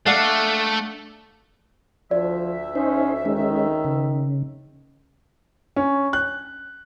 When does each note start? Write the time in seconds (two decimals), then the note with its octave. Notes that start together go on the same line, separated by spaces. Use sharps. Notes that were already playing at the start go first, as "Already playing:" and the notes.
0.06 A3 D4 F5 F#5
2.11 D2 F3 D5 E5
2.75 C#4 D#4 C5
3.25 D#3 G#3 C#4 D#4
3.84 C#3
5.76 C#4
6.13 F#6